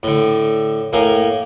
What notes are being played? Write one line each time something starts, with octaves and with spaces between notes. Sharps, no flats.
A2 D3
A2 A#3 F5 G#5